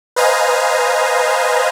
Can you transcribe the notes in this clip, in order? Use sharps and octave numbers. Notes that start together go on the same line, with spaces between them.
B4 C5 D#5 F5 G#5 A#5